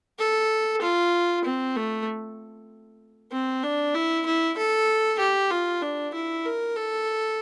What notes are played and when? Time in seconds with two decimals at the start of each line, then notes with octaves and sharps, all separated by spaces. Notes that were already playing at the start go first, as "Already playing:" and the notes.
0.19 A4
0.82 F4
1.45 C4
1.76 A3
3.32 C4
3.64 D4
3.94 E4
4.26 E4
4.57 A4
5.19 G4
5.50 F4
5.82 D4
6.14 E4
6.45 A#4
6.76 A4